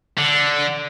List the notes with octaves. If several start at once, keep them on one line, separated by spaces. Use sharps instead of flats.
D3